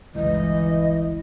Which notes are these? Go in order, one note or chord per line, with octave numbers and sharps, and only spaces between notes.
G1 C#2 E3 D#5